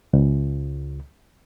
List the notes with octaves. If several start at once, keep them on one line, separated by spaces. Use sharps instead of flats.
C#2